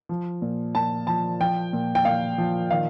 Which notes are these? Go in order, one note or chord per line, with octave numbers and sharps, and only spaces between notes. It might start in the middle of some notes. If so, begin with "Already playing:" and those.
F3
A#2
A#2 A5
F3 A5
F3 G5
A#2
G5
A#2 F5
F3
D#3 F5